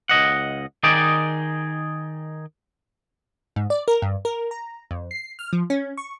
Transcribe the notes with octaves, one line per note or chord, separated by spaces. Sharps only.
C#2 G2 D#5 F#5
D#3 D#4 G#4 D5 G5
G#2
D5
A#4
G2
A#4
A#5
F2
C7
F6
F3
C#4
C#6